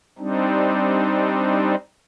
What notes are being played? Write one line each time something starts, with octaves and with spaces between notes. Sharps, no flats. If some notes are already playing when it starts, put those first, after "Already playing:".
G3 C4 D4 D#4